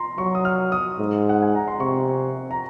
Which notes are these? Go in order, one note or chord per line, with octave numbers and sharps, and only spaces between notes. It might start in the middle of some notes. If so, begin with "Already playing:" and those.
Already playing: A#5 C6
F#3 C#6
D#6
F6
D#6
G#2
F#5
G#5
A#5
C6
C3 C#6
A#5